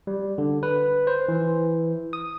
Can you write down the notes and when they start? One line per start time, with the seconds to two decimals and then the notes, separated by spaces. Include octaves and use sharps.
0.07 G3
0.38 D3
0.63 B4
1.07 C5
1.28 E3
2.13 D#6